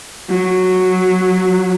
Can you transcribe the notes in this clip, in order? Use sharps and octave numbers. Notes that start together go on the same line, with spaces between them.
F#3